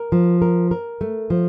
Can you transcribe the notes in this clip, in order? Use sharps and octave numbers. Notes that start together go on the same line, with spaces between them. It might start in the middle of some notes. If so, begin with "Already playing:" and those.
Already playing: A#4
F3
A#4
A#4
A3
F3